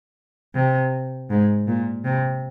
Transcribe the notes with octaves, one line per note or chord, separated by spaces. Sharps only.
C3
G#2
A#2
C3